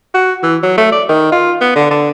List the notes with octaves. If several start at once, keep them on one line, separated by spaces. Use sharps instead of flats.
F#4
E3
F#3
A3
D5
D#3
F4
B3
D3
D3